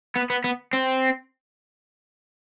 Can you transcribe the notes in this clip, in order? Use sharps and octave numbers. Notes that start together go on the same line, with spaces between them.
B3
B3
B3
C4